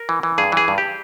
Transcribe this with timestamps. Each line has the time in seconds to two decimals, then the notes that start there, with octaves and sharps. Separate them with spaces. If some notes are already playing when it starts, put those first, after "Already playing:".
Already playing: A#4
0.09 E3
0.23 E3
0.38 G2 G#4
0.52 E3 G#4
0.68 G2
0.78 G4